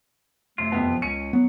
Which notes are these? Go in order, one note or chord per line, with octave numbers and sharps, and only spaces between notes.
F#2 C3 A3 F4
F2 B3
F3
C#2 C#4 G#5 C#7
F#3 B3